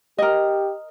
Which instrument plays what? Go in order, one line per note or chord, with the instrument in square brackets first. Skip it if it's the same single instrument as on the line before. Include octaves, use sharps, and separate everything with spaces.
[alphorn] G4 [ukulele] A#4 D#5